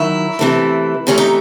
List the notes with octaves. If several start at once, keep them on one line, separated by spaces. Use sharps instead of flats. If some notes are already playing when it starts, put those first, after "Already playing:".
Already playing: D#3 F#3 E4
C3 E3 A3
C3 E3 A3 C#4
D#4